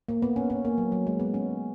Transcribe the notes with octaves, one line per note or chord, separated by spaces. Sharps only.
A#3
B3
C#4
C#4
A#3
F#3
F#3
G#3
B3
C#4